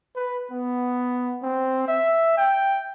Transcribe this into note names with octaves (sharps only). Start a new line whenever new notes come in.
B4
B3
C4
E5
G5